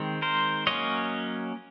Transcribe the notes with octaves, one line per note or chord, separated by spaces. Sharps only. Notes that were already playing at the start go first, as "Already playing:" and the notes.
Already playing: D#3 G#3 C4
A#4 C5
F#3 A#3 C#4 C#5 D#5